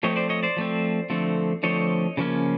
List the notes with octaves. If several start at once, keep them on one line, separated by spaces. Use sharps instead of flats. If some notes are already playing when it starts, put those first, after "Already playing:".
F3 A3 C4 C#5 D#5
C5 D5
C#5 D#5
C5 D5
F3 A3 C4
D3 F3 A3 C4
D3 F3 A3 C4 C#5 D#5
C#3 F3 A#3 C#4